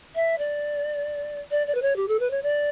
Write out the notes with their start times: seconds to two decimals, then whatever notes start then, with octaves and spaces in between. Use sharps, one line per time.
0.15 E5
0.38 D5
1.51 D5
1.67 D5
1.74 B4
1.82 C#5
1.96 G4
2.08 A4
2.19 B4
2.31 C#5
2.43 D5